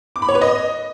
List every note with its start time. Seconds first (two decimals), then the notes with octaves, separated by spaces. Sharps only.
0.16 D6
0.22 B5
0.29 C#5
0.35 B4
0.42 D#5